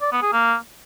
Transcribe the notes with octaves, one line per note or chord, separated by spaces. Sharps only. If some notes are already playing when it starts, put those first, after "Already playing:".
D5
B3
G#4
A#3